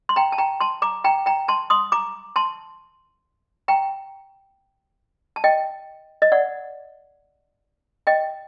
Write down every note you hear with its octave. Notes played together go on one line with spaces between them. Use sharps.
C6
G5 A#5
A5
G5 A#5
A5 C6
A#5 D6
G5 A#5
G5 A#5
A5 C6
C6 D#6
A#5 D6
A5 C6
G5 A#5
A5
D#5 G5
D#5
D5 F#5
D#5 G5